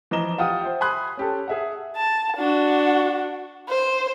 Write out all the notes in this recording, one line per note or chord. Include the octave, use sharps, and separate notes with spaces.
E3 F3 D#5 A#5 E7 G7
F4 G4 F#5 G5 D#6
C5 E5 G5
G#5 B5 C6 D#6 F#6
C#4 G4 A4
G#4 E5 F#5
A5
D4 F#4
C5